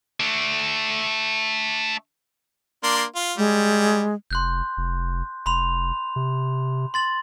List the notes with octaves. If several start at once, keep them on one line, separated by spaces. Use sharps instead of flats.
A3 D4
A#3 D4 C6
F4
G3 G#3
F1 C6 F#6 G6
F1
F1 B5 C6 F7
C3
C6 A6 F#7